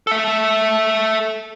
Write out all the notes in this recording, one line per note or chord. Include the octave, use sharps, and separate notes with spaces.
A4 E5